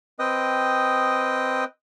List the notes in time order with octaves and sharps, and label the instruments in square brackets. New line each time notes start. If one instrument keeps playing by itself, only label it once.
[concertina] C4 B4 D#5 G5 D#6